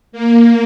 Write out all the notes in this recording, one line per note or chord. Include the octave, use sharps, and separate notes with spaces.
A#3